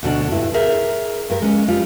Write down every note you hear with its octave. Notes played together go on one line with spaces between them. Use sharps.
D2 B2 D4
G2 E4
G#4 A#4 E5
G2 A#4
G#3 C#4
G3 F4